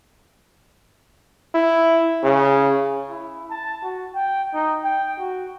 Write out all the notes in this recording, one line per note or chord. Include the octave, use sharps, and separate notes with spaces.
E4
C#3
E4
A5
F#4
G5
D#4
G5
F#4